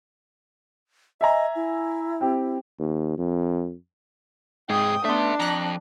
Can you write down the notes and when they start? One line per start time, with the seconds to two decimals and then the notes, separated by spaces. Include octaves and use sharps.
1.21 D#5 E5 G#5 A#5
1.56 E4
2.21 C4 G4
2.80 D#2
3.18 F2
4.70 G#2 C3 G#4 G5 D#6
5.05 A3 B3 D4 E5 C6
5.40 F2 A#5 F#6